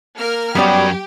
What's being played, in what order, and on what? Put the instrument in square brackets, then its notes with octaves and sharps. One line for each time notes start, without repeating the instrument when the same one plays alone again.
[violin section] A#3 A#4 F6
[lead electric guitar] F#2 F#3 [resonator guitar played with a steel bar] G3 B3 D5 [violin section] G4